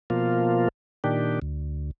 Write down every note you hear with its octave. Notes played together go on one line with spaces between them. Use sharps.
B2 F3 A#3 F4
A#2 D#3 D4 G4
D2